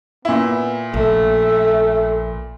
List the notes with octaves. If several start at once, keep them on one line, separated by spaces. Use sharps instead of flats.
A#2 B3 E4
A#1 A3 E5